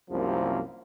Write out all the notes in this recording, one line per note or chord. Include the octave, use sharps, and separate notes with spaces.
C2 F#2 C3 F3 A#3